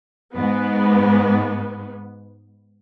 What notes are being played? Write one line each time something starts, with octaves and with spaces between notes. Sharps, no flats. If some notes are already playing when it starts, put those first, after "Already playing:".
G#2 B3